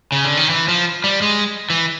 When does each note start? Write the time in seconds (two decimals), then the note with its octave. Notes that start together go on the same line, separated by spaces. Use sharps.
0.12 C#3
0.25 D3
0.37 D#3
0.50 E3
0.68 F3
1.04 G3
1.22 G#3
1.70 E3